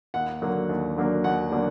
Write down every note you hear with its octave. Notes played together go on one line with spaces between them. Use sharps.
D#2 F#5
D3 F#3 A#3 D4
D#2
D3 F#3 A#3 D4
D#2 F#5
D3 F#3 A#3 D4